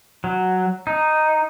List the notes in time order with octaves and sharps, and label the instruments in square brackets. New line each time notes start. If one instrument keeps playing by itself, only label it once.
[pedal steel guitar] F#3
D#4